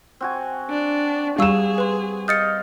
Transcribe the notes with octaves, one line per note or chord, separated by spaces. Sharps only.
C4 F#4 G#5
D4
G3 G#4 F5 C#6 E6 E7
B4 C6
D#5 F5 G6 A6 C#7